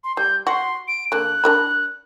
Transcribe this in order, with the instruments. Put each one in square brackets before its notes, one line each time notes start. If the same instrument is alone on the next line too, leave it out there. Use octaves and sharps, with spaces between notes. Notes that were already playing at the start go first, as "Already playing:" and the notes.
[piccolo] C6
[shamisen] G3 [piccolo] G6
[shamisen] F#4 [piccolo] C6
[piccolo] D7
[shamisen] D3 A#3 [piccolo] F#6
[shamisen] D4 A#4 B5